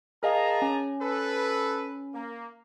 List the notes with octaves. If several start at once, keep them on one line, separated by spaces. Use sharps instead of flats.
G#4 A#4 D#5 F5 A5 A#5
C#4
A4 B4
A#3